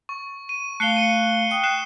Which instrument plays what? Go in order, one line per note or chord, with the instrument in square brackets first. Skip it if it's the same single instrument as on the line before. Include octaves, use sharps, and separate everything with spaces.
[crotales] C#6
D#7
[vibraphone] A3 F5 [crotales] F#6 C7 G7
[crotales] C#7 D#7
[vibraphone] G5 D#6
[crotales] F#6 C7 E7